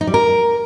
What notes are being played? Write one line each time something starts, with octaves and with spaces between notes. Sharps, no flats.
D#4
G3
A#4